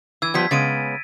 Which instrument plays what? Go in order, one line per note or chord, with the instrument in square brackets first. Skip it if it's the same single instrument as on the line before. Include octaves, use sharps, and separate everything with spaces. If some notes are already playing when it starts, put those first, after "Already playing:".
[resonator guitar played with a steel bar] E3 [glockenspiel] E6 G#6
[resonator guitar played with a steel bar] F3 G3 B3 [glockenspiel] G#6 B6
[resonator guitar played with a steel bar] C#3 G#3 B3 [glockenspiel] A6 D7 D#7